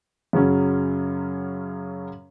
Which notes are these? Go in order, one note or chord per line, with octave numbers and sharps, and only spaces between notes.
F#2 C#3 F#3 C#4